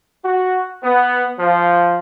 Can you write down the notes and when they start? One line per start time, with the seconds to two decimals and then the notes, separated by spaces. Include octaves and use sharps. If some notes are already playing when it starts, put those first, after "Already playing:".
0.25 F#4
0.84 B3
1.39 F3